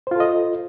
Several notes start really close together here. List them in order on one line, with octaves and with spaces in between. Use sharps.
C5 F4 A4 D#5